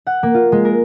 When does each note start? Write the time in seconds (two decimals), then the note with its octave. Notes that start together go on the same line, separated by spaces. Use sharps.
0.07 F#5
0.23 A#3
0.34 F4
0.52 G#3
0.65 A#4